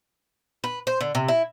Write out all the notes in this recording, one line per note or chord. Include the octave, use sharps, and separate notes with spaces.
B4
C5
D3
C3
E4